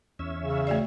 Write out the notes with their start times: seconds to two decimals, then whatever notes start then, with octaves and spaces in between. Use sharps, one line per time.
0.19 E2 C#4 E5
0.42 C#3
0.67 A3 F#4 D5